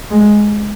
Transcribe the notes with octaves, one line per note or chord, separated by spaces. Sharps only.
G#3